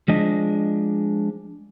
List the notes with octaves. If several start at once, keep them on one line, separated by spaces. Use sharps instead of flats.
F3 G#3 D4 D#5